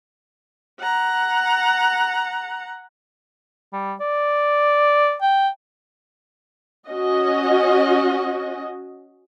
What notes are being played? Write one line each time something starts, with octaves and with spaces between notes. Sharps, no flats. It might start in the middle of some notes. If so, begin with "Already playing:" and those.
F#5 A#5
G3
D5
G5
C#4 F#4 D#5